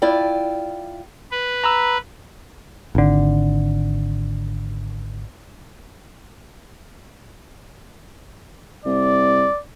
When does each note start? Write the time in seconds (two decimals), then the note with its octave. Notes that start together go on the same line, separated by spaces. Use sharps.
0.02 E4 F4 D5 G5
1.31 B4
1.64 A#5 B5 E6
2.95 G#1 D3
8.86 C2 D5